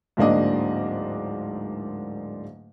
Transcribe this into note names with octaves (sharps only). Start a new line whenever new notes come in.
D1 G#2 A#3 D4 D#5